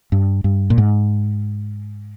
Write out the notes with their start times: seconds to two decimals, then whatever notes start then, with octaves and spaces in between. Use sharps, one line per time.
0.12 G2
0.44 G2
0.70 A#2
0.78 G#2